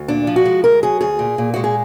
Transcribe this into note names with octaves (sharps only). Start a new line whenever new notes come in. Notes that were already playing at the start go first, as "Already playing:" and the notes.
Already playing: D2
A#2 D4
F3
F#4
G#3
D2 A#4
F#3 G#4
D2 G#4
A#2
A#2
G#3 F#4
G#4